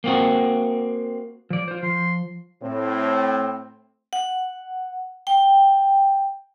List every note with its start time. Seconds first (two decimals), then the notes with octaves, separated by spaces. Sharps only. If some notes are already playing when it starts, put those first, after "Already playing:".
0.04 A#3 C4 F#4
1.50 F3 D5
1.68 F4 C5
1.83 F3 C6
2.62 A2 C4
4.13 F#5
5.27 G5